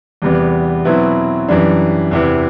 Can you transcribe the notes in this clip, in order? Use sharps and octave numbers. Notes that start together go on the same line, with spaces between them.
E2 C3 G3 B3
B2 F#3 C4 E4 B4
F#2 E3 G3 D4
E2 C3 E3